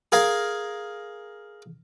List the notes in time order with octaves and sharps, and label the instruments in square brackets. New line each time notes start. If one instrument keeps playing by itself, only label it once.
[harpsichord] G#4 A#4 F5 G#5